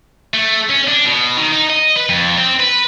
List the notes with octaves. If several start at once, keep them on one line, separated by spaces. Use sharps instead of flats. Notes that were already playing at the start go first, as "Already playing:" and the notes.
A3
C#4
D4
B2
D#3
D#4
D#5
B4
F2
C4
B4